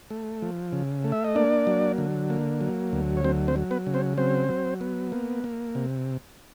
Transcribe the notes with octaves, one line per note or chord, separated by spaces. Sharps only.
A3
F3
C#3
A3
E5
D#5
A#3 D4 D5
F#3
D3
A#3
F#3
D2
C#5
F#3 C4 C5
C4 C5
F#3
B3 B4
C#3
C4 C5
F#3 C4 C5
F#3
B3
A#3
A#3
C3